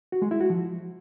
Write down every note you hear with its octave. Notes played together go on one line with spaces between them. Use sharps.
F#4
G#3
E4
F#4
F3